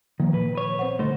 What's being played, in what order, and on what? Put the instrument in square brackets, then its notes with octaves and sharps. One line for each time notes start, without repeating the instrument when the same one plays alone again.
[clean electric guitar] D#3 [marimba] F3 A#3
[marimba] A#2 [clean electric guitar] B4
[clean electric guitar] B4 C#5
[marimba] C4 C5 F#5
[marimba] D3 [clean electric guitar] A3 D#4 C5